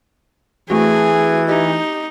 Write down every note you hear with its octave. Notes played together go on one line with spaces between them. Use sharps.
E3 A3 C4 F#4 G#4
D#4 G4